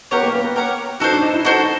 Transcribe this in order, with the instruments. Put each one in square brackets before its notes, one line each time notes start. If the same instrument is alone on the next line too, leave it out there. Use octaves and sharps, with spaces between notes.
[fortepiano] B3 [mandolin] G4 A#4 C#5 F#5
[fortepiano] A#3
B3
[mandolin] G4 A#4 C#5 F#5
[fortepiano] D#4 [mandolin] F#4 A4 C5
[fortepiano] D4
D#4
E4
[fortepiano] D#4 [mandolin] F#4 A4 C5